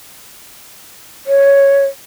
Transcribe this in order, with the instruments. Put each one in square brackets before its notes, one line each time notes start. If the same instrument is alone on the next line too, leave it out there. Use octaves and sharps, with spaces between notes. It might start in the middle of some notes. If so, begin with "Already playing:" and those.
[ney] C#5